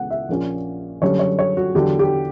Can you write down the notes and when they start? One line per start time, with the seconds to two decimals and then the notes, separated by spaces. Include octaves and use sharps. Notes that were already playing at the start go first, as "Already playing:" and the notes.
Already playing: C#2 C#3 E3 B3 F#5
0.10 E5
0.29 A#1 A#2 A#3 C#4
1.01 F#1 F#2 D3 G3 C#4 C#5
1.19 C#5
1.39 C#5
1.57 F#4
1.74 E2 D3 F#3 G4
1.99 G4